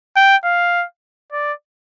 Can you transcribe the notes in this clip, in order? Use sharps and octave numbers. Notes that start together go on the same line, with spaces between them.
G5
F5
D5